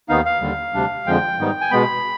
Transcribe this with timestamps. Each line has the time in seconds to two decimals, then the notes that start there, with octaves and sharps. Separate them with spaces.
0.09 D#2 D#3 B3 D#4 F5
0.26 F5
0.41 D#2 D3 G3
0.74 D2 C3 G3 D4
1.06 F2 D3 F3 G#3 G5
1.39 G#2 D#3 G3 B3 D#4
1.61 G#5
1.71 B2 G#3 B3 B5